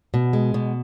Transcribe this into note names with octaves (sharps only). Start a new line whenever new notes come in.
B2
G#3
B2